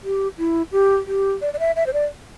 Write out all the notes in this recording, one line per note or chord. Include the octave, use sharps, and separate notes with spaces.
G4
E4
G4
G4
D5
D5
E5
E5
C5
D5